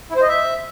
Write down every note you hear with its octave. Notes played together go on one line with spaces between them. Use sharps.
E4
C5
D#5
E5